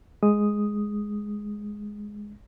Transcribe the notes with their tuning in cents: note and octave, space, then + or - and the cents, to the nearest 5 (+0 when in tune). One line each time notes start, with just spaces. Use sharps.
G#3 +0 D#6 +0